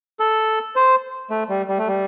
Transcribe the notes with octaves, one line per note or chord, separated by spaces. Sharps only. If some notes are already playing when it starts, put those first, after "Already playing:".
A4
C5
A3
G3
G3
A3
G3